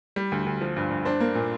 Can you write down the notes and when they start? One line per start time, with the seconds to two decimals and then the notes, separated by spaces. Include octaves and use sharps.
0.16 G3
0.32 D2
0.46 D2
0.61 F3
0.76 G2
0.90 G2
1.05 D4 C5
1.20 A#3
1.35 A#2